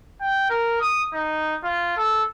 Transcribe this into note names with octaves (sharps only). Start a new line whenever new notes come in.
G5
A#4
D#6
D#4
F4
A4